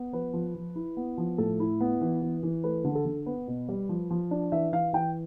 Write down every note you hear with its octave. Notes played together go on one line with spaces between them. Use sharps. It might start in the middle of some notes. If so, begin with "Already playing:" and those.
Already playing: B3
F3 B4
F3
F3
E4
B3
F3
A2 A4
E4
B3
E3
E3
E3
A3 B4
D3
A4
D3
B3 B4
B2
G3
F3
F3
D4
E3 E5
E3 F5
E3 G5